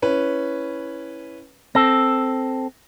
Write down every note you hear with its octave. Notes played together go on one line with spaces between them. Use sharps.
C#4 E4 B4
C4 A4 A#6